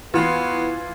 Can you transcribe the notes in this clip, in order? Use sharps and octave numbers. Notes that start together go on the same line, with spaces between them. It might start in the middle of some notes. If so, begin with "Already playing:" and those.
E3 B3 F4 F#4 C6